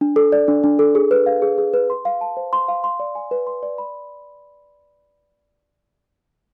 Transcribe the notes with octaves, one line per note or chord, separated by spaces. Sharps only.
D4
A4
D5
D4
D4
A4
G#4
B4
F5
G#4
G#4
B4
C6
F5
A5
C5
C6
F5
C6
D5
G#5
B4
C6
D5
B5